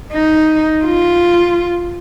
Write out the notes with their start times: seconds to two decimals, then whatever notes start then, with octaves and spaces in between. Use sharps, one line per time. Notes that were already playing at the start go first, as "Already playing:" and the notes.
0.13 D#4
0.84 F4